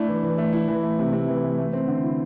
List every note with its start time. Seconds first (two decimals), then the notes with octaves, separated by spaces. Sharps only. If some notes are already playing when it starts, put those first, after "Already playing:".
Already playing: A3 D4 E4
0.08 E3
0.23 E3
0.38 A3
0.53 E4
0.68 E3
0.83 A3
0.99 C3
1.13 C3
1.28 E3
1.44 A3
1.58 A3
1.73 C4
1.87 D3
2.03 E4